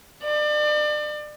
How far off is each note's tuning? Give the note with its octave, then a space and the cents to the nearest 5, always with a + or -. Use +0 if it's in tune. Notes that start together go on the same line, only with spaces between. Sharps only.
D5 +35